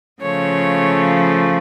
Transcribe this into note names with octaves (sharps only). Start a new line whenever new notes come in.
C#3 F3 A3 C#5